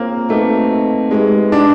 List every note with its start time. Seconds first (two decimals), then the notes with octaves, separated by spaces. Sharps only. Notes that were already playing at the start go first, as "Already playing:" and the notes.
Already playing: A#3 C4 F4 G#4 C#5
0.29 A3 C4 D#4 F#4 B4 D#5
1.11 G#3 D#4 G4 B4 D#5
1.52 D4